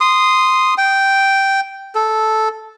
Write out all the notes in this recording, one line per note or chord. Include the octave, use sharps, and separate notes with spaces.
C6 D#6
G5
A4